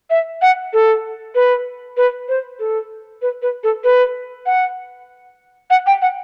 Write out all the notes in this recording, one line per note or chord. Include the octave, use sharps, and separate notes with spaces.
E5
F#5
A4
B4
B4
C5
A4
B4
B4
A4
B4
F#5
F#5
G5
F#5